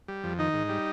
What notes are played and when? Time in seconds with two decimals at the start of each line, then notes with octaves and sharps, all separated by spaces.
0.08 G3
0.24 F2
0.38 D#3 D#4
0.54 G#2
0.69 G3